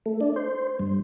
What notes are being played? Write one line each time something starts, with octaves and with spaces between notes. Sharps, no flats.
A3
D4
C5
G2